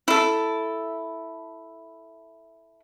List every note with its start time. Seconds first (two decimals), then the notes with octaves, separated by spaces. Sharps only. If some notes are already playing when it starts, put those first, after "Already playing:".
0.08 E4 A4